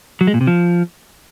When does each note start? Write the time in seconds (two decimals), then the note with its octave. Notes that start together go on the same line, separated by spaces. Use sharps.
0.21 F#3
0.27 G#3
0.34 A#2
0.41 C3
0.47 F3